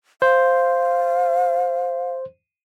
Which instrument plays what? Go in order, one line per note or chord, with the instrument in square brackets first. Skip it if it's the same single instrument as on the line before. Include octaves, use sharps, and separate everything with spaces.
[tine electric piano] C5 [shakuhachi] F5